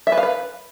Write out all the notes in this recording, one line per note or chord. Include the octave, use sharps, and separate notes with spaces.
E5
B4
F5
B4